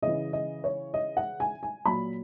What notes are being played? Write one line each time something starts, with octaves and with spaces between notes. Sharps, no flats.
C#3 E3 D#5
D#5
C#5
D#5
F#5
G#5
G#5
A#2 F#3 B5